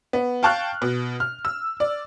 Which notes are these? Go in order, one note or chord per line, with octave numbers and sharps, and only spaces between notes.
B3
F5 G5 A5 C#6 F6 F#6
B2
F6
E6
D5